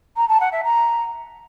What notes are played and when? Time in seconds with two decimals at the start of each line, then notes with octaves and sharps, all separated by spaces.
0.17 A#5
0.29 A5
0.40 F#5
0.52 E5
0.64 A#5